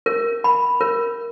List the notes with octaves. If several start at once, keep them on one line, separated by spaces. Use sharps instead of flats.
A#4
B5
A#4